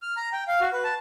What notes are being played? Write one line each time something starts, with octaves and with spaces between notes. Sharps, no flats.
F6
A#5
G5
F5
F#4
B4
A5